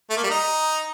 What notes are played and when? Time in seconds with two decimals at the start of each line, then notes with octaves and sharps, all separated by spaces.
0.10 A3
0.17 A#3
0.23 G3
0.30 D#4